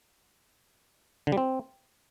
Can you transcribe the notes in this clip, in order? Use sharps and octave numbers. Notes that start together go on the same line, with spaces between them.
D3
G3
C4